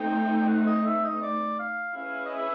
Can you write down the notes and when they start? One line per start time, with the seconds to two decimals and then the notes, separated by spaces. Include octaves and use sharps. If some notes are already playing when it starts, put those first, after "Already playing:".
Already playing: A3 C4 D#4 G5
0.37 G5
0.48 F#5
0.67 D#5
0.85 E5
1.04 D#5
1.22 D5
1.59 F5
1.97 C#4 E4 G#4 B4 F5
2.25 D#5
2.34 E5